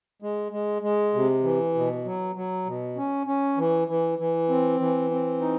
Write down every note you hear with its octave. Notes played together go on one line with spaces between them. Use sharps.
G#3
G#3
G#3
C3
E3
B2
F#3
F#3
B2
C#4
C#4
E3
E3
E3
C4
E3
C4
D#4